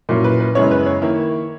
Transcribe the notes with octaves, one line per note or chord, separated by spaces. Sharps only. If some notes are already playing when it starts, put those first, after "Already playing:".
A#2 F#3 C#4 E4
B4
B4
F#2 C#3 G#3 B3 E4 C#5
B4
C#5
D#3 A#3 E4